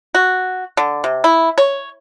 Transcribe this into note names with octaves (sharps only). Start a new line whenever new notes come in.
F#4
D3
C3
E4
C#5